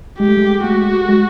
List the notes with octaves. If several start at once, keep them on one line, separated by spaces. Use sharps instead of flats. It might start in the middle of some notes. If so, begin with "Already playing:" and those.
G#3 G4
A3
G#3
A3 F#4
G#3